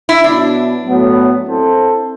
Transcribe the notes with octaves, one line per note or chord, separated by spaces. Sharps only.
E4
B2 F#3 B3 D4 E4
A2 F#3 B3
C4 E4 A4 C5